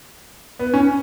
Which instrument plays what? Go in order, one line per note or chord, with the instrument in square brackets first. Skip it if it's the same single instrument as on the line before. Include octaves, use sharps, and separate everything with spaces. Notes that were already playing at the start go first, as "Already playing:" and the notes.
[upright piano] B3
C#4